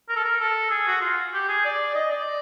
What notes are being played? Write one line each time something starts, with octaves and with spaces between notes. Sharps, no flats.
A#4
A4
A#4
A4
G#4
F#4
F4
G4
G#4
D5
D#5
D5